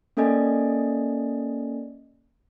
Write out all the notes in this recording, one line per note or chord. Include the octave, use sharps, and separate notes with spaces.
A#3 C#4 A4 D5 D#5 G#5